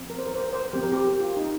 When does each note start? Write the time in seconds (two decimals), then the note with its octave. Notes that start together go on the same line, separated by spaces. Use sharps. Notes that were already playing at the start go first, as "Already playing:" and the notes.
Already playing: F3 C4
0.10 A#4
0.19 C5
0.27 A#4
0.35 C5
0.44 A#4
0.53 C5
0.61 A#4
0.73 F3 C4 G4
0.83 A#4
0.92 G4
1.20 F4
1.37 D#4